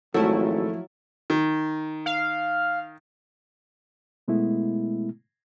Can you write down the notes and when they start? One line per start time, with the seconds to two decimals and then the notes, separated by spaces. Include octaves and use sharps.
0.14 G#1 F3 F#3 A3 E4 F4 A4
1.30 D#3
2.06 F5
4.28 B2 G#3 A3 B3 E4